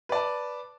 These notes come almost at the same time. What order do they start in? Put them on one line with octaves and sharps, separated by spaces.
B4 D5 A5